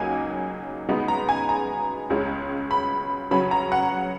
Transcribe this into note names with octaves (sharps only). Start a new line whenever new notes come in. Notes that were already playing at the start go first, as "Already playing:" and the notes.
Already playing: C#2 C#3 F#3 A#3 D#4 G#5
C#3 G#3 B3 D#4
A#5
G#5
A#5
C#2 C#3 G#3 C#4
B5
C#3 F#3 C#4 B5
A#5
F#5